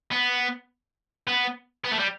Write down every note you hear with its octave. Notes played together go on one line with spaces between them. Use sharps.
B3
B3
B3
A3
G3